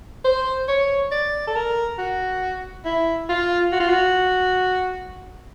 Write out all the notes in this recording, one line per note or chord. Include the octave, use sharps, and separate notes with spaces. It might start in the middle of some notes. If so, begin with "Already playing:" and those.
C5
C#5
D5
A4
A#4
F#4
E4
F4
F#4
F4
F#4